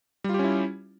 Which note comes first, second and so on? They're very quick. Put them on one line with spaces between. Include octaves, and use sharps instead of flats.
G3 F4 G4 C#4 E4